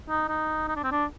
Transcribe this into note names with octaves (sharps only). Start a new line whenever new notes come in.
D#4
D#4
D#4
D4
C4
D4